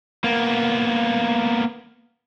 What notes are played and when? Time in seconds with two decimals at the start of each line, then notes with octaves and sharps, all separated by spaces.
0.24 A#3 B3